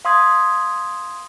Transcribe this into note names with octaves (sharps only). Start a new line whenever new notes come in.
F5 C6 D#6 G#6